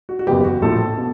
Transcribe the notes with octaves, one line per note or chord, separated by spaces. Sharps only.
F#4
F#4
F#1 E2 C#3 E3 G4
F#4
A#1 A2 F3 A4
B2